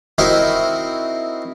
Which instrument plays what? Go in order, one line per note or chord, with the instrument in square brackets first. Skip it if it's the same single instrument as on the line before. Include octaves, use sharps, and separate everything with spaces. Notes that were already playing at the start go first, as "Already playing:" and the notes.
[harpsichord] C4 D#4 E4 F#4 A#4